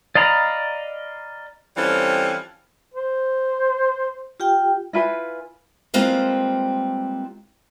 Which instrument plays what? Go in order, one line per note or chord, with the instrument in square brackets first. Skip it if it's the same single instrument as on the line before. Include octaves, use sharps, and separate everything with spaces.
[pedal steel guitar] D5 D#5 F5 A#5 B5
[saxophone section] E3 F3 G3 C4 C#4 A4
[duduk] C5
[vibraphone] F4 G4 G5
[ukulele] E4 F4 B4 G#5
[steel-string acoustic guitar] G3 G#3 A#3 C4 F4 B4